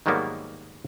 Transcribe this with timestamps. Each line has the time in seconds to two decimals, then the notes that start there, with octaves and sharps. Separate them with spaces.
0.06 G#2 D#3 F#3 G3 A#3 B3